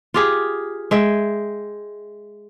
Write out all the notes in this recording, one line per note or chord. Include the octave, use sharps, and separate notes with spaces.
F4 G4 G#4
G#3 E5 G5